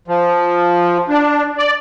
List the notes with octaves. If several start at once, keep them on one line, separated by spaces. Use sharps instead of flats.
F3
D4
D5